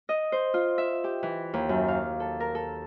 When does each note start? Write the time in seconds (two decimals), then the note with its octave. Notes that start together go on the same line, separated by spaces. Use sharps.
0.09 D#5
0.32 C5
0.54 F4
0.78 E5
1.04 G4
1.23 E3
1.54 D#2
1.69 F#2
1.88 F5
2.20 A4
2.40 A#4
2.55 A4